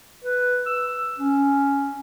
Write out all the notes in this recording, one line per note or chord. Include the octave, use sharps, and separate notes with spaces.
B4
E6
C#4